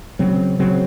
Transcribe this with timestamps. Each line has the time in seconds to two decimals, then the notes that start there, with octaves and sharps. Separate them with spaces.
0.19 C#3 F#3 C4
0.59 C#3 F#3 C4